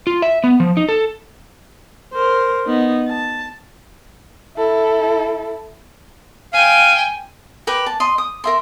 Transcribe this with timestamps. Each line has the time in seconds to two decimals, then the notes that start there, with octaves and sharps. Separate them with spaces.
0.07 F4
0.22 E5
0.44 B3
0.60 F3
0.77 D#4
0.89 A4
2.13 A#4 C5
2.66 B3 D#4
3.08 A5
4.56 E4 A4
6.53 F5 G5 G#5
7.67 G4 A#4 B4
7.86 A5
8.00 D#5 C6
8.18 D#6
8.44 A#4 E5 C6